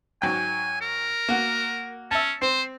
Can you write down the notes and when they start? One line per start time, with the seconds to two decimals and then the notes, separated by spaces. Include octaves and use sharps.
0.22 G#2 F#3 G5 G#5
0.81 A#4
1.29 A#3 F#4
2.11 C#4 E5 A5
2.42 C4 C5